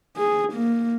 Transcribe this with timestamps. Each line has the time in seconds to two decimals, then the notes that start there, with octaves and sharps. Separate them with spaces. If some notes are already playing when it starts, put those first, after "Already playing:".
0.17 G#4
0.53 A#3